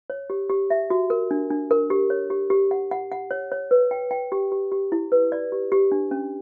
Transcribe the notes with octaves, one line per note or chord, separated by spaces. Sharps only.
C#5
G4
G4
E5
F#4
A#4
D4
D4
A#4
G4
C#5
G4
G4
F#5
F#5
F#5
C#5
C#5
B4
G5
G5
G4
G4
G4
E4
B4
D5
G4
G4
D4
C#4